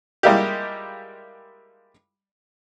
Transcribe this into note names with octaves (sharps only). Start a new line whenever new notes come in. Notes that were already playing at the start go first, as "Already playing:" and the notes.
G3 G#3 A#3 E4 F4 G4